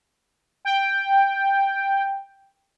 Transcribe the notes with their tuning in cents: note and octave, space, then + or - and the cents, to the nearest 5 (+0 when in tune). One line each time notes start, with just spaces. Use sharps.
G5 +5